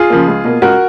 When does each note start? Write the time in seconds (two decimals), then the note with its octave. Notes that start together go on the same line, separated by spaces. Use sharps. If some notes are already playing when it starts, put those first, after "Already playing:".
Already playing: F4 G#4
0.10 C#3 F3 A#3
0.28 C#2
0.45 B2 A#3
0.62 C#2 F#4 A#4